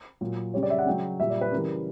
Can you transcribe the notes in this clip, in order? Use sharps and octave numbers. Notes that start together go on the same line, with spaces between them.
A#2 F#3
C#3 G3 C#5
D5
E5
F#5
C#3 F#3 G5
A#2 G3 E5
D5
B4
C#3 E3 G3 A#4